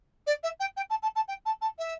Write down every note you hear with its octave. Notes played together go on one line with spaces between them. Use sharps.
D5
E5
G5
G5
A5
A5
A5
G5
A5
A5
E5